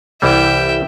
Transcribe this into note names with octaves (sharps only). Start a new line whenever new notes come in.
C2 E3 G3 E5 G5